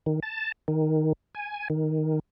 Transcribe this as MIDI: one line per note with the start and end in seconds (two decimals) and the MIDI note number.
0.06 0.20 51
0.23 0.52 81
0.68 1.13 51
1.35 1.68 80
1.70 2.19 51